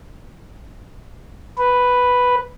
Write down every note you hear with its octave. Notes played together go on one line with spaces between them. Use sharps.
B4